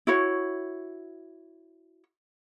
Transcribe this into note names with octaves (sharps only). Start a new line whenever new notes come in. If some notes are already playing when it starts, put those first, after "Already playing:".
E4 F#4 C#5